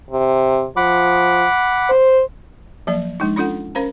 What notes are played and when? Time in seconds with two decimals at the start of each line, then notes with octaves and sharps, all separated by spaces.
0.11 C3
0.77 F3 F#5 B5 D6
1.90 C5
2.87 F3 F#3 A#3 D5
3.20 F3 G#3 D4 D#4
3.36 C#4 D4 F4 A4 F#5
3.75 C#4 A#4 C5 F5 A#5